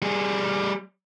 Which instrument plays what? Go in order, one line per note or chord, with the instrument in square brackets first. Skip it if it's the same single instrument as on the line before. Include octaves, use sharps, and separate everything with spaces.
[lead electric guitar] G3 G#4